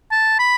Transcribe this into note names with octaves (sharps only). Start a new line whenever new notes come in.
A5
B5